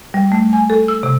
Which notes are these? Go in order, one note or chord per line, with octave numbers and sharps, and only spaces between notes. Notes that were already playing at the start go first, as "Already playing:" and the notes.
G3
A3
G#5
A4
E6
C3